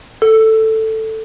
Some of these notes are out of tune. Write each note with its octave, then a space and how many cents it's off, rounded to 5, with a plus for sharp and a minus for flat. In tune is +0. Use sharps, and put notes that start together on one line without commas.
A4 +5